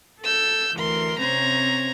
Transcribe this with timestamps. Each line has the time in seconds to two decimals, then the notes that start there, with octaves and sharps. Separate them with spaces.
0.23 A4 E6 G6
0.77 D2 E3 A#4 C6
1.20 C3 C4 C#4 C5 A#5 G#6